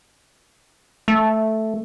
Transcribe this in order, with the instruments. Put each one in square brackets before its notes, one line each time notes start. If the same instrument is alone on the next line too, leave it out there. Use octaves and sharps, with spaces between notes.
[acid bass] A3